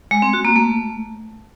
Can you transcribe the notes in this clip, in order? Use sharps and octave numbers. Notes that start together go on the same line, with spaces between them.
G#3
C4
F#4
A#3
A3